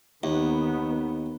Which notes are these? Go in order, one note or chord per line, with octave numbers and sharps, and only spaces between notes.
D#2 D#3 B3